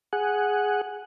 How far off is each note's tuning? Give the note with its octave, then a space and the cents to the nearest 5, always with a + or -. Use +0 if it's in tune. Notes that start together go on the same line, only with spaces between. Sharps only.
G#4 +0 F#5 +0